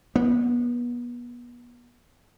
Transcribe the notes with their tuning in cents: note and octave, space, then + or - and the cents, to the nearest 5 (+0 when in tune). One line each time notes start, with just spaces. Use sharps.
B3 -30